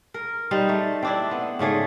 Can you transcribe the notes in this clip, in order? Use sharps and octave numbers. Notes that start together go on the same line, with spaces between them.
A#4
G3 D#4 C5
A3
C4 D4 E4
B3
G#2 C#3 A3 G#4